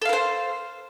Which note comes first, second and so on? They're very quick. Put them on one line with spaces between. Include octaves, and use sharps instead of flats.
A4 F5 A#4 C5